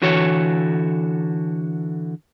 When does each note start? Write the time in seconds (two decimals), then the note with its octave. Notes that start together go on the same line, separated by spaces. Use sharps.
0.02 D3 E3 F#4 A4 C#5